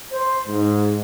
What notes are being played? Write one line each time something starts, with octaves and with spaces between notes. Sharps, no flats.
C5
G#2